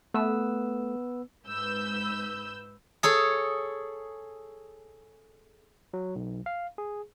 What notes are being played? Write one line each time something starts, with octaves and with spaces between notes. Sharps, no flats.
A3 B3 B4 E6
G#2 B4 E6 G6
G#4 A4 C#5
F#3
B1
F5
G#4